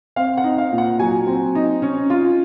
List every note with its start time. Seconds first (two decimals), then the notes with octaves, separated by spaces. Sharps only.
0.16 C4 F5
0.37 F#5
0.44 D#4
0.58 F5
0.72 A#2
0.78 F#5
0.99 F#3 G#5
1.26 C4
1.55 D#4
1.82 C#4
2.10 F4